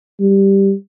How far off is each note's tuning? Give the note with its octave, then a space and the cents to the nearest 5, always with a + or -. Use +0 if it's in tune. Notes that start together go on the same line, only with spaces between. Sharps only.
G3 +0